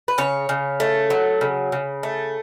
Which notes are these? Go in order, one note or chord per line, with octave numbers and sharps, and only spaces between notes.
B4
C#3 C#5
C#3
A3
F#3
C#3
C#3
A3